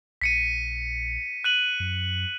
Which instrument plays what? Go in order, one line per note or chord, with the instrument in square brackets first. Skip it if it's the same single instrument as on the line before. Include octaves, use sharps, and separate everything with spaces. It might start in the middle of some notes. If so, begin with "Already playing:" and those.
[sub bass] A#1 [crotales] B6 C#7 D#7
[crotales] F#6 D#7 F#7
[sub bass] F#2